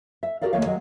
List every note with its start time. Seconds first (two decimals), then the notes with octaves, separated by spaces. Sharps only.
0.23 E5
0.42 F#4 G4 A4 A#4 D5 F5
0.53 D#2 D#3 A3 A#3 C#5 F5
0.66 D#3 F#3 G#3